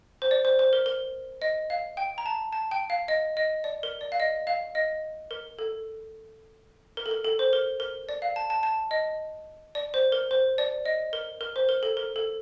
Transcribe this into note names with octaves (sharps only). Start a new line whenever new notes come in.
C5
D5
C5
C5
A#4
A#4
D#5
F5
G5
A#5
A5
A5
G5
F5
D#5
D#5
D5
A#4
D5
F5
D#5
F5
D#5
A#4
A4
A#4
A4
A#4
A4
C5
A#4
A#4
D5
F5
A5
A5
A5
D#5
D5
C5
A#4
C5
D5
D#5
A#4
A#4
C5
A#4
A4
A#4
A4